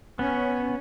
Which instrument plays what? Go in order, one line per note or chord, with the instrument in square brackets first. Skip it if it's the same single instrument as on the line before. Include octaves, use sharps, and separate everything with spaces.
[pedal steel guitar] B3 [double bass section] C#4